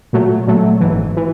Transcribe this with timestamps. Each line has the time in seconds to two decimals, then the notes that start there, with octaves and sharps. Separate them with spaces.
0.13 A#2 F#3 A3
0.47 A#2 F#3 A3
0.80 G#1 G#2 E3
1.17 E3